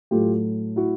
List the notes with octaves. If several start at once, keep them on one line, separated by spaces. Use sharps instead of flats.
A2 F#3 A3 F4 G4
E4 F#4